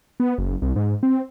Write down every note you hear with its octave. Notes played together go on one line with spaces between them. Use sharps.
B3
F#1
C2
G#2
C4